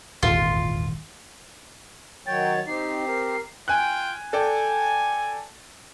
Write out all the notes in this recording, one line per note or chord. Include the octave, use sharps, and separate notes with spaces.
D#1 G#1 E2 F4
D#3 F#3 C#5 G5 A6
C4 D#4 G4 C7
A#4
F4 G5 G#5 F#6
A4 D5 G5 G#5